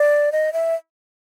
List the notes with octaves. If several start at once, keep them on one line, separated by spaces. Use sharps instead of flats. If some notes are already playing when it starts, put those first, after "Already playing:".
Already playing: D5
D#5
E5